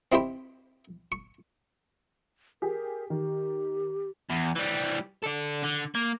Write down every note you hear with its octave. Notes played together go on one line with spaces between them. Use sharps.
C4 D#4 E4 G4 C5 B5
C#6
G4 G#4 A#4
D#3 G4
E2
E3 G3
A4 D5
D3
A#3